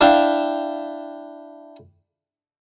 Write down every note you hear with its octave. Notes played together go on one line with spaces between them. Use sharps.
D4 E4 E5 F5 G5